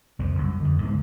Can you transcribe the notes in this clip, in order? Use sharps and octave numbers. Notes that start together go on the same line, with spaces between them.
C2 F2 F3
C2 F#2
F2 D3 D#3
C#2 G#2 F3 A#3